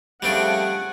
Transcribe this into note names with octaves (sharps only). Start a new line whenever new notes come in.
C#3 F3 G3 A3 C4 D4 F#5 G#5